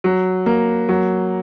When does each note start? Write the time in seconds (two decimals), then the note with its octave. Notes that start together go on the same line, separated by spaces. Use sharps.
0.04 F#3
0.46 A#3
0.89 F#3